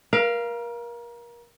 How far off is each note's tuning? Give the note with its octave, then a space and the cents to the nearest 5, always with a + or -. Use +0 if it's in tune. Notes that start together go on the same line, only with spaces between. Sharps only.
A#4 +30 F5 -15